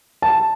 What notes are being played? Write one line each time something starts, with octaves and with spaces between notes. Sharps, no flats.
A5